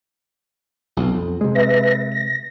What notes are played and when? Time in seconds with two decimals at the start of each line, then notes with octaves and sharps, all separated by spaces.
0.97 B1
1.15 F2
1.41 C3 G#3
1.55 B4 E5 A#6
2.12 A#6